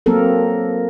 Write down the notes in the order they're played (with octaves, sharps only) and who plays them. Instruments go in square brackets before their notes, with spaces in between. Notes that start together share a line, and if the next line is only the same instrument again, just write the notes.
[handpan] F#3 A#3 C4 A4 A#4